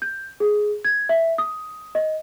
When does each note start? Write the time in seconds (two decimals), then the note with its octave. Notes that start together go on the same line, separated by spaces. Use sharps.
0.02 G6
0.40 G#4
0.85 G#6
1.09 E5
1.38 D#6
1.95 D#5